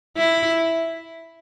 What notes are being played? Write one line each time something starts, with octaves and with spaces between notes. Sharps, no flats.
E4